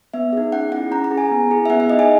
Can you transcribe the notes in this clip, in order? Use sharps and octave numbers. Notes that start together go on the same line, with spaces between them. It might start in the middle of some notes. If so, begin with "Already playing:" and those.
B3 E5
D#4 G#4
C#4 F#5
E4 G#4 F#5
C#4 A#5
A#5
G#4
G#5
B3
E4 G#4
E5
B3 F#5
E5
D#4 G#4 D#5
G#5